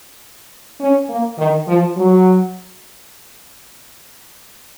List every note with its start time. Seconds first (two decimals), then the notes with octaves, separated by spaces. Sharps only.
0.80 C#4
1.09 A#3
1.38 D#3
1.68 F3
1.97 F#3